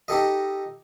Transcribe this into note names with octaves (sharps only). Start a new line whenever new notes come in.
D#4 G4 A4 D#5